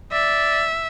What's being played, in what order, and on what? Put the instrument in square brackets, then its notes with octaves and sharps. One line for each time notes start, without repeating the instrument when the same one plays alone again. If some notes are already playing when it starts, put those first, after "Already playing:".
[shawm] D5 [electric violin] E5